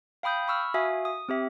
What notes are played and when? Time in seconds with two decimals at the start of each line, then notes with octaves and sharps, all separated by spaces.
0.23 F5 G5 B5 D#6 G6
0.48 B5 C#6 E6 F6
0.74 F#4 E5 F5 G#5 D#6
1.05 D#6
1.29 C4 G4 E5